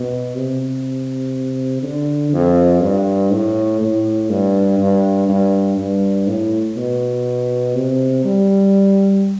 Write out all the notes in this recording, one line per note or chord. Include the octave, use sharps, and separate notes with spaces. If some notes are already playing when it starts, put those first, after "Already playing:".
Already playing: B2
C3
D3
F2
G2
A2
A2
G2
G2
G2
G2
A2
B2
C3
G3